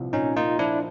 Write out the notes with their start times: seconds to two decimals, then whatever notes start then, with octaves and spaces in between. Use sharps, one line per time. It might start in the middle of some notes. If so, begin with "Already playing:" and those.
Already playing: C2 A#2 F3
0.13 A#2 C#4 D#4
0.36 A#3 D#4 F4
0.58 F3 D4 E4